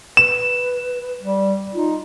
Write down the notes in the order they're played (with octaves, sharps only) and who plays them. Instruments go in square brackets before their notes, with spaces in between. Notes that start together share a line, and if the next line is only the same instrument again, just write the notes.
[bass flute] B4 [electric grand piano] E7
[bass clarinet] G3
[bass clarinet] D#4 [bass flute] F4